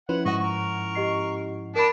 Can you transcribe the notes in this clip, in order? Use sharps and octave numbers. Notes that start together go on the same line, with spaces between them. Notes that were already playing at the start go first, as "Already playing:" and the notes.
F3 C#4 E4 B4 F#5
G#2 F#4 D#5 F#5 C#6
A#4 C#6
G4 D#5 C7
D4 G4 A#4 A5 B5